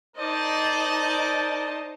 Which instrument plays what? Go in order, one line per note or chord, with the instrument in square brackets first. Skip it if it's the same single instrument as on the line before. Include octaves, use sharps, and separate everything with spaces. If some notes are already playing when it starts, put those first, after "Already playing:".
[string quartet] D#4 D#5 A5 [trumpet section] A#4 C5 D5